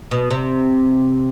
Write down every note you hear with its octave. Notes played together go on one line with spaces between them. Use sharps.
B2
C3